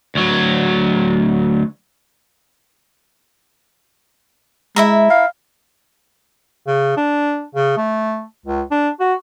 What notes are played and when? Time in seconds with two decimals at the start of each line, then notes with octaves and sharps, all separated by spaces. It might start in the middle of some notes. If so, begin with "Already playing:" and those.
0.15 D2 F#3
4.76 G#3 E4 E5 A#5
5.10 F5
6.67 C#3
6.97 D4
7.55 C#3
7.77 A3
8.46 C#2
8.71 D4
9.00 F#4